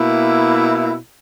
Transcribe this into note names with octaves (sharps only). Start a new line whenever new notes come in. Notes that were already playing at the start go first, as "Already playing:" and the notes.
Already playing: B2 A#3 E4